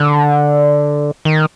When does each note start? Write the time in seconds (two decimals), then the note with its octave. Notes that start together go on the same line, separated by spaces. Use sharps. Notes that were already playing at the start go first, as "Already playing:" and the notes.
Already playing: D3
1.25 D#3